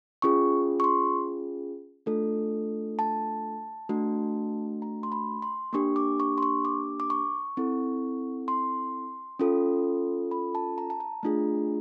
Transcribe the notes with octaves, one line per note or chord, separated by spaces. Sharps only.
C#4 F4 G#4 C#6
C#6
C6
A3 D4 F4 A4
A5
A3 D4 F#4
A#5
C6
B5
C6
A#3 D4 G4 C#6
D6
C#6
C6
C#6
D6
D6
C#6
C4 E4 A4
C6
C#4 F4 A4
B5
A5
A#5
A5
A#5
A3 D4 F4 G#4